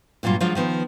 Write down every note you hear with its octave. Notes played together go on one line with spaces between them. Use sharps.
G2 A#2 F#3 G3 F4
F3 F#3 G#3 D4 F4
D#3 F3 B3